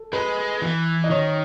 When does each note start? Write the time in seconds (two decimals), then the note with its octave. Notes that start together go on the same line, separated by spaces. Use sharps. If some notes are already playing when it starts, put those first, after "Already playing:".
Already playing: A4
0.13 G#3 B4
0.62 E3
1.04 D#5
1.11 D#3 C#5